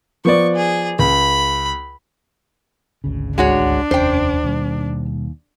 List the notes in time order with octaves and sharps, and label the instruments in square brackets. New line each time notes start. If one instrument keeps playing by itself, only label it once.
[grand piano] F3 B3 D5 [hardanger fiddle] C#6
[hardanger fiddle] G#4
[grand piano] C#2 [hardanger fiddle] B5
[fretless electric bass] G#1 D2 C#3
[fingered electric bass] C#2 [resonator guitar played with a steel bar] G#3 F#4 C#5 [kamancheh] D4
[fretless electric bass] F1 C#4 [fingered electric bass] D#2 [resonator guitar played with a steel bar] C5 G5
[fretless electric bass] D#2 [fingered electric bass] B2 G3